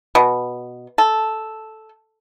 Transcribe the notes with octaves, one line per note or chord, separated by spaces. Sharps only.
B2
A4